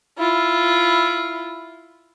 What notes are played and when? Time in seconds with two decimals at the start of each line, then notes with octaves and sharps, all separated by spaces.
0.18 E4 F4